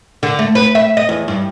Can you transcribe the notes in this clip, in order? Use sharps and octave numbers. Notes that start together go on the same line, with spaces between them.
D3
A3
B4
E5
D#5
E2
G2